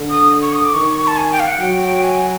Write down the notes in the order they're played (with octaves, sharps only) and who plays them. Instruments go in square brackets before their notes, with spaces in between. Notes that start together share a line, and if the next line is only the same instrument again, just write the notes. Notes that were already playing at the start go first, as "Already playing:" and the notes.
Already playing: [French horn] D3
[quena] D#6
C#6
D#6
D6
[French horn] D#3 [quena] C#6
[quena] A5
G#5
G5
F5
F#5
[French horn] F#3 [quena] G5
[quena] G5
G#5